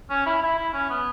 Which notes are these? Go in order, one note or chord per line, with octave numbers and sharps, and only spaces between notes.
C#4
E4
E4
E4
C#4
B3